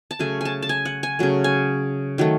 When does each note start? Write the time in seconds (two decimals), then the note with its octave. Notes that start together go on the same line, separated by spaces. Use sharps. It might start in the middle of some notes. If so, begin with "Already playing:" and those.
0.11 A5
0.19 C#3 F#3 A3 G#5
0.41 G#5 A5
0.62 A5
0.69 G#5
0.85 F#5
1.03 G#5
1.19 C#3 F#3 A3
1.44 G#5
2.18 D#3 F#3 A3